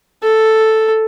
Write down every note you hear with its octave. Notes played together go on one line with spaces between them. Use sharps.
A4